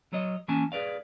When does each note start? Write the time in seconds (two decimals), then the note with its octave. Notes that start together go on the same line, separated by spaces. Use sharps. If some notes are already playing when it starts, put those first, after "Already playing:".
0.13 F#3 C#5 D#5
0.48 E3 A#3 C#4 G#5 A5
0.72 G#4 B4 D5 F5